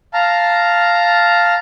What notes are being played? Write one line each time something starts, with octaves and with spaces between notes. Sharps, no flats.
F5 A5 A#5 F6